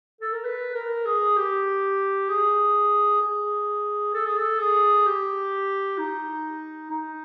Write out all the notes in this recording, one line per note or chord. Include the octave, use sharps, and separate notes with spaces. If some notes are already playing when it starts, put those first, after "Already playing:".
A4
A#4
B4
A#4
G#4
G4
G#4
G#4
A4
G#4
A4
G#4
G4
D#4
D#4